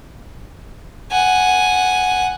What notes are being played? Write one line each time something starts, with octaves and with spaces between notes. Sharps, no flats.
F#5 G#5